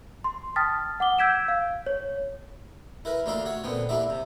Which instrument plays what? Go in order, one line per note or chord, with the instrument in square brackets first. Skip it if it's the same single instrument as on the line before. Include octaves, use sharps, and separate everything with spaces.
[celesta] C6
G5 A5 D#6 F6 A6 B6
F#5 D6 G7
E6 G6 G#6 B6 D7 E7
F5
C#5
[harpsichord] E4 A#4 B4
D2 A#3 D4 F4 E5 F5
F#4 C#5
A#2 D3 B3 C4
G3 A#3 D4 E4 E5
C3